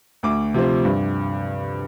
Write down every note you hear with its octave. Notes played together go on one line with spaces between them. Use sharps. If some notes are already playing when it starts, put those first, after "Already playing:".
D2 D6
C3 F3 C4
G2